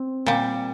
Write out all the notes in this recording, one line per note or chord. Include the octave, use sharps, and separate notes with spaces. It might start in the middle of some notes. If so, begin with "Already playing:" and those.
Already playing: C4
A#2 G3